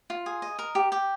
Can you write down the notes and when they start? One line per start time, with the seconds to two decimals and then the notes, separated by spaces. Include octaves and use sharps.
0.10 F4
0.26 G#4
0.42 D#5
0.59 A#4
0.75 G4
0.92 G4